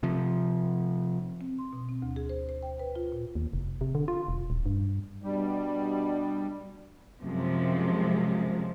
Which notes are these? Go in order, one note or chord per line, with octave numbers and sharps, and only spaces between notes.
C3 F3
C4
C6
B2
C4
D2
G#4
C5
C5
G5
B4
F4
A#2
D#2
F1
C3
D3
F4
E1
D#1
G2
B2 G3 D4
F#2 C3 F3 G#3